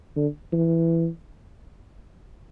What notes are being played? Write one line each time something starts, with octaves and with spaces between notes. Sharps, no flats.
D3
E3